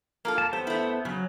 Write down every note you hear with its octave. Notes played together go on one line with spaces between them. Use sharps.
A#3 F4 A4
A5
B3 G4 A4 C5
A3 E4
C#3 F#3